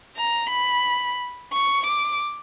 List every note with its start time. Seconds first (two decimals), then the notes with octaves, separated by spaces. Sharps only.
0.16 A#5
0.49 B5
1.52 C#6
1.86 D6